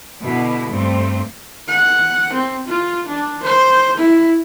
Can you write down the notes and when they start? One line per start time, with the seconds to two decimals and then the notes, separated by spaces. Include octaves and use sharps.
0.23 B2 D3 E4
0.69 G2 A3 C4
1.68 F#5
2.33 C4
2.68 F4
3.08 D4
3.43 C5
3.97 E4